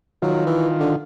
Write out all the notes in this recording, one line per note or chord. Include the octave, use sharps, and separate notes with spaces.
D#3 F#3 F4
E3
D3